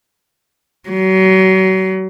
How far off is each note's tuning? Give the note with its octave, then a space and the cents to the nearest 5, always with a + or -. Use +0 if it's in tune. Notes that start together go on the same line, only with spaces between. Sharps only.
F#3 +35